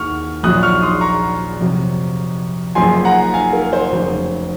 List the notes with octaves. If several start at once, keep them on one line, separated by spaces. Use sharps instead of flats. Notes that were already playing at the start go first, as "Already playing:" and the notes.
Already playing: D#2 C#6 F6
A#1 A#2 F#3 D#6 F#6
C#6 F6
C6 D#6
A#5 C#6
F2 C3 F#3
F#1 F#2 F3 G#5 C6
F#5 A#5
F5 G#5
A#4
C5
F1 F2 C#3 F#3